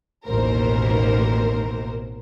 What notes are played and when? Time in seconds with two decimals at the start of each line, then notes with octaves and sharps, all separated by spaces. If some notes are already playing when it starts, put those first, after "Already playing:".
0.27 A1 D#2 B2 A#3 A#4 C5